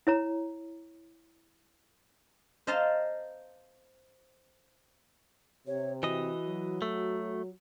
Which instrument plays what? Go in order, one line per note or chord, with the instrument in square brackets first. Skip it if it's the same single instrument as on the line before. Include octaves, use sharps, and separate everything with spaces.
[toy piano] E4 C#5 A#5
[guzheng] C5 D#5 F5 A5 A#5 C6
[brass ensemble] C3 [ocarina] C#5
[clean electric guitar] E3 D#5 [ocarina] F#4
[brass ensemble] F#3
[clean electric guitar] A3